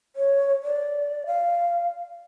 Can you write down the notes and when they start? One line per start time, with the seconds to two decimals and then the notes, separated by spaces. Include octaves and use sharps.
0.16 C#5
0.63 D5
1.26 F5